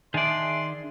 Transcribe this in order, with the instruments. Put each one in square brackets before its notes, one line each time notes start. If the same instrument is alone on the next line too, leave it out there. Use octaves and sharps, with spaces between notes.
[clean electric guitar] D#3 D5 [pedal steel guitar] D4 G#4 [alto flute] E5 [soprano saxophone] C6